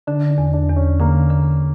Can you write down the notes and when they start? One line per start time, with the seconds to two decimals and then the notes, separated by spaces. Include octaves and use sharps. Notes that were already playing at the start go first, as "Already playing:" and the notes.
0.07 D3 D4
0.30 D4
0.38 E2
0.53 D4
0.69 E2
0.76 C#4
1.00 D3 A#3
1.31 D3